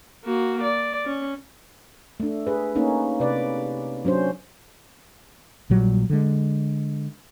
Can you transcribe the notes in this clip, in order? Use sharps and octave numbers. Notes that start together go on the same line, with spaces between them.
A#3 F#4
D5
C#4
A3 D4
G#4 B4
A#3 C#4 D#4
C3 B4 D5
F#3 C#4 D4 C5
A#1 A#2 F#3 G3
D3 G#3